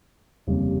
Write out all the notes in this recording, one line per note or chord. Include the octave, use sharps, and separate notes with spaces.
F1 D#2 C#3 G3